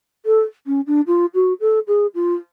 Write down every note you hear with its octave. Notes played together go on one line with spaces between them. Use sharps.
A4
C#4
D4
F4
F#4
A4
G#4
F4